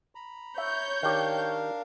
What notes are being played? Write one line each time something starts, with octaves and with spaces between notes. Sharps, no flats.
A#5 B5
C#5 E5 G6
D#3 D4 G4 A#4 F5